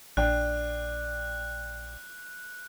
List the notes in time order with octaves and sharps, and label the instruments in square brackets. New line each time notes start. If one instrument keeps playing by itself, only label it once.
[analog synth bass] A#1 [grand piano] D4 G5 [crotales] F#6